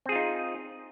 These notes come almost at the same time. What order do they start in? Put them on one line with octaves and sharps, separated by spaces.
C4 G#4 F4 D#4